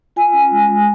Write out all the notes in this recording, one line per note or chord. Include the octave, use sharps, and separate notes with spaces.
F4 G#5
C#4
G#3
G#3